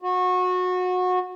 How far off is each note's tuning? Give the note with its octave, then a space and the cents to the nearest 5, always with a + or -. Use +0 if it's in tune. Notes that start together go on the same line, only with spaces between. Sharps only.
F#4 -25